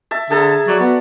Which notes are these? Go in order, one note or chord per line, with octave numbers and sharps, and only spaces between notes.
E5 A5
D3 G#4 A4 A5 A#5
F#3 D5
B3 F#4